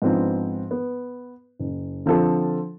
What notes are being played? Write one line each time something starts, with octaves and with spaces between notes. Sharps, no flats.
G#2 F3 B3 C4 D4
B3
F#1
D3 F3 C4 A4